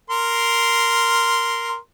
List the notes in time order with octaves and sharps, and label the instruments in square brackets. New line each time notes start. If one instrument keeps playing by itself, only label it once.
[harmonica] A#4 C6